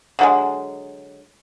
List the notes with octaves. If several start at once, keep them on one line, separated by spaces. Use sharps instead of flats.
D3 F#3 G#3